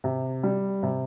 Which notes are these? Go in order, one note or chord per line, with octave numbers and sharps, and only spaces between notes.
C3
G3
C3